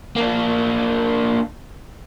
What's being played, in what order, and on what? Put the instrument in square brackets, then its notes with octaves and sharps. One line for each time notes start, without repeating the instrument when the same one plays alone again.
[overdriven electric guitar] A#3 D4